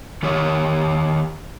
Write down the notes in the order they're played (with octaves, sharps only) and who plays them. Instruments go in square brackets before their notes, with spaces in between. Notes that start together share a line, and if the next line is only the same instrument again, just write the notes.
[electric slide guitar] D#3 D#4 G4 C#5